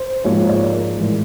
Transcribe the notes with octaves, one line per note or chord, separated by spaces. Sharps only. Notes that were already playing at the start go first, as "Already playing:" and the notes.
Already playing: C5
G#2 F3 A#3 C#5
D5
A#4
A2 E3 G#3